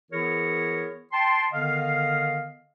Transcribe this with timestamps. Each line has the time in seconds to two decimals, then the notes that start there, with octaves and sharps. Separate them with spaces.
0.11 E3 B3 E4 G#4 A#4 C#5
1.13 G5 A5 C6
1.52 D3 D#3 B3 D#5 F5